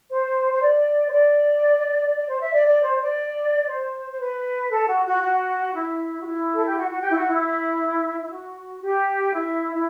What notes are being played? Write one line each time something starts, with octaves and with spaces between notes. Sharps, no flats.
C5
C5
D5
C5
D5
D5
C5
E5
D5
D5
C5
D5
C5
C5
B4
A4
F#4
F#4
F#4
E4
F#4
E4
A4
G4
F#4
F#4
G4
E4
F#4
E4
E4
F#4
G4
E4
E4